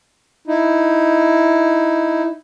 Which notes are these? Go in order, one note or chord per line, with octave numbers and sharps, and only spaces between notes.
D#4 E4